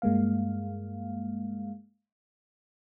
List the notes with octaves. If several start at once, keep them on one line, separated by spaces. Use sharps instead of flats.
G2 G#3 A#3 F5